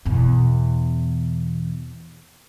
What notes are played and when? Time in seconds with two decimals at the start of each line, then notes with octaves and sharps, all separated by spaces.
0.05 E2 B2